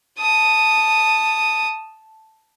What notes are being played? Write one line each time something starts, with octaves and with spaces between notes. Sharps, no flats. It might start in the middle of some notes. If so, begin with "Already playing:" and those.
A5 D#6